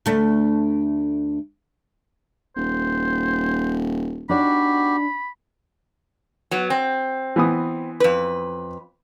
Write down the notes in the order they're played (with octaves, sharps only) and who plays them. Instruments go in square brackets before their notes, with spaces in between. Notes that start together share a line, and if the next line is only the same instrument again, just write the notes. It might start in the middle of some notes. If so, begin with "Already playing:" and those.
[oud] D2 A3
[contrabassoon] D#1 [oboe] C5
[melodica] B3 F#4 G4 [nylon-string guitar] D4 D#4 D5 [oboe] B5
[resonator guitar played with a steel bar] F#3 B3
C4
[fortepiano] E3 B3 D#6
[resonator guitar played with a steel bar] F2 B4